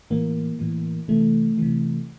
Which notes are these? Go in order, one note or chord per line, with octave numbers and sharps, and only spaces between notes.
A2 E3 A#3
A2 E3
C3 E3 A3
C3 E3